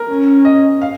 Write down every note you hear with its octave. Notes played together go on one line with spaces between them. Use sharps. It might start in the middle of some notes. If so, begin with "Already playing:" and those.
Already playing: A#4
C#4
D#5
F5